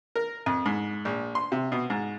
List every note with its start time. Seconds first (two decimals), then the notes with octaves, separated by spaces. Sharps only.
0.16 A#4
0.46 F2
0.66 G#2
1.05 A#1
1.35 C6
1.52 C3
1.72 B2
1.90 G#2